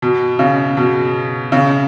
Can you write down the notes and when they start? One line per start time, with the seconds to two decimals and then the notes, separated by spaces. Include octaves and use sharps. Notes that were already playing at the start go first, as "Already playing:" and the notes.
0.02 B2
0.39 C#3
0.77 B2
1.52 C#3